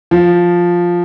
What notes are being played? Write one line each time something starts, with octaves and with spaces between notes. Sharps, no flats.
F3